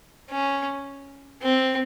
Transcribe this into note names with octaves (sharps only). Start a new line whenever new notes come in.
C#4
C4